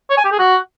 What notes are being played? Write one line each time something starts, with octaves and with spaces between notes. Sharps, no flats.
C#5
G#5
G4
G#4
F#4